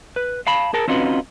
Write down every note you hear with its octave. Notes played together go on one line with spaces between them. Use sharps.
B4
F5 A5 B5
G#4 A#4 A5
C4 C#4 D#4 F4 F#4 B4